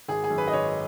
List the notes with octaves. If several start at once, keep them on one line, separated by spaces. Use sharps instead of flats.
G#1 G#4
G#4
F#2 D#3
B4
D#5
G#1 C#5